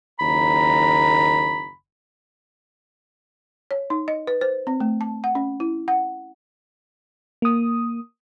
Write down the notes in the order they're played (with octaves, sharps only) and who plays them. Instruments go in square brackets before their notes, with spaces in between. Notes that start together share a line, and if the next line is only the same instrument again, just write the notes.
[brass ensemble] F#1 D#2 A#5 [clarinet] B5
[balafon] C#5
D#4
D#5
B4
C5
C4
A3
A5
F#5
C#4
E4
F#5
[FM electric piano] A#3 D#6